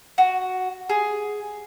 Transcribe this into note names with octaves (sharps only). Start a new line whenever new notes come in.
F#4
G#4